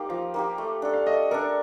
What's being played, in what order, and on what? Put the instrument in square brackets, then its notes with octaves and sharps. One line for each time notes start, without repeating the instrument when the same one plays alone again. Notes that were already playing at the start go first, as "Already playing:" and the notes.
Already playing: [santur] A#3 D#4 G4 C5
[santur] F3 [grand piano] F5
[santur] A#3 D#4 G4
A3
D4 A4
[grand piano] F5
[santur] A3 [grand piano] D#5
[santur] D4 A4 [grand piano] A#4